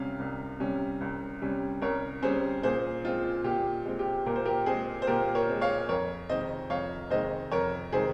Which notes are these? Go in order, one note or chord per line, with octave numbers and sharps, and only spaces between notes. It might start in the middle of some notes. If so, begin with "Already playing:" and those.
Already playing: C2 C3 G3 C#4 F5
C2
C3 G3 C#4
C2
C3 G3 C#4
C2 A#4 C#5
C3 G3 C#4 G#4 C5
A#2 G#4 C5
G#3 C4 F4
A#2 G4
G#3 C4
G4
A#2 A#4
C5
G4 A#4
G#3 C4 G#4 C5
C5
A#2 G4 A#4
A#4 C#5
G#3 C4
C#5 F5
F2 A#4 C#5
C3 D#3 G#3 C4 C5 D#5
F2 C#5 F5
C3 D#3 G#3 C4 C5 D#5
F2 A#4 C#5
C3 D#3 G#3 C4 G#4 C5